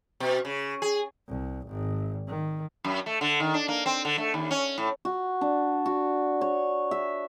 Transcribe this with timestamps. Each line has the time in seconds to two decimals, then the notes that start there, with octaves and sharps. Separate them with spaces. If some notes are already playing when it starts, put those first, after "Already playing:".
0.20 B2
0.45 C#3
0.82 G#4
1.28 C2
1.66 G#1
2.28 D#3
2.84 F#2
3.06 A3
3.21 D3
3.40 D#3
3.54 D4
3.68 A#3
3.86 C4
4.05 D3
4.18 A3
4.34 D#2
4.51 C#4
4.78 A2
5.05 F#4
5.41 D4
5.86 F#4
6.41 C#5
6.91 E5